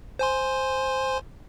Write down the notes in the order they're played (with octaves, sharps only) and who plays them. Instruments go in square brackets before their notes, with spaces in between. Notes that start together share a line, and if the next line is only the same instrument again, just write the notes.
[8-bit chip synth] C5 G#5 C6